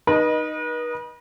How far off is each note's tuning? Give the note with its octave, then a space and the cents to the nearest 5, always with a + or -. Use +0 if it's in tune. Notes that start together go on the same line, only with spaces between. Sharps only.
D#4 -15 B4 -40 D#5 +0